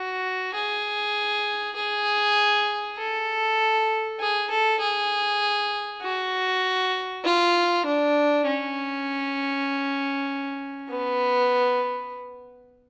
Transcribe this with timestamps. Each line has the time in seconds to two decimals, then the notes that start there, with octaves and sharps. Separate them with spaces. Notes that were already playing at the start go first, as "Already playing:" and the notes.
Already playing: F#4
0.54 G#4
1.76 G#4
2.98 A4
4.20 G#4
4.50 A4
4.81 G#4
6.02 F#4
7.24 F4
7.86 D4
8.46 C#4
10.90 B3